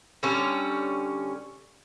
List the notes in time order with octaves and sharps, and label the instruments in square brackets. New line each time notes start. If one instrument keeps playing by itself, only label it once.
[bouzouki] D3 G3 C#4